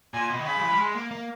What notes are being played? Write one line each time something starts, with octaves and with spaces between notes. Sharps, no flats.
A#2 G#5
B2
D#3
C#3 B5
G3
E3
G3
G#3
A#3
A#3